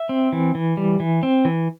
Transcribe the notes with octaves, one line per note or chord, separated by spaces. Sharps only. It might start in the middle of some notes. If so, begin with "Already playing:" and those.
Already playing: E5
C4
E3
E3
G3
E3
C4
E3